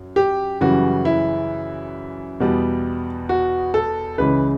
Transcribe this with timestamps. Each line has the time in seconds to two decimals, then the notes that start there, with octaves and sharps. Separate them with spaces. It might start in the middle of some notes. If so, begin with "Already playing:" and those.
Already playing: F#2
0.16 G4
0.61 F#2 C#3 E3 G3 F#4
1.05 E4
2.40 E2 B2 G3
3.29 F#4
3.74 A4
4.18 C#2 C#3 E3 B4